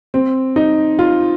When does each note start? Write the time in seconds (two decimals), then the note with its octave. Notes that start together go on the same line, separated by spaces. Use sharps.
0.14 C4
0.56 D#4
0.99 F4